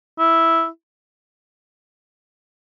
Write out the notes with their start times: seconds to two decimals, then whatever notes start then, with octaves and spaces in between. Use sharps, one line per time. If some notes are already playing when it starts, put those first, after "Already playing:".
0.19 E4